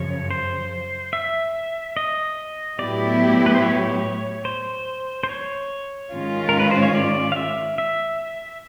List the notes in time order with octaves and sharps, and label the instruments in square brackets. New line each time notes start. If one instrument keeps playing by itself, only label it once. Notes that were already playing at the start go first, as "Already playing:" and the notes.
Already playing: [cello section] F#2 C#3 F3 [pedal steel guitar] C#5
[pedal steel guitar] C5
E5
D#5
[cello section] A2 F#3 B3 E4 G4 [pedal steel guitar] D5
[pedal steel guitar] B4
C5
C#5
C5
C5
C#5
[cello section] G#2 D#3 G#3 C#4 F4
[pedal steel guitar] A#4
B4
C5
C#5
D5
F5
E5
E5